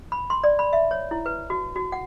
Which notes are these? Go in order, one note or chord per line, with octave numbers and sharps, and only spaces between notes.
B5
C6
D5
B5
E5
C#5
E4
B4
F#4
F#4
F#5